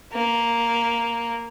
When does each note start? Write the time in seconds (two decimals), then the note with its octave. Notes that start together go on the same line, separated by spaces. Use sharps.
0.13 A#3